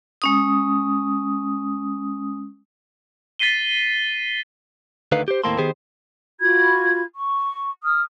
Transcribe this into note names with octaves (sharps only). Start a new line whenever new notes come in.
G#3 C#4 D#6
A6 B6 C7 D#7 G7
D2 D3 D#3 D#4 B4 F5
G4 C5
D#2 A2 A#3 C4 A4 C6
D#3 B3 G4 G#4 C5
F4 F#4 B5 G#6
C#6
D#6 F6